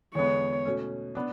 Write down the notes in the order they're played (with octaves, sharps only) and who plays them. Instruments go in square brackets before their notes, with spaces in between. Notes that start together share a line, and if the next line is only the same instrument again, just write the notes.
[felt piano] E2 D3 G#3 B3 [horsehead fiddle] C#5
[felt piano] B2 A3 C#4
B3 D4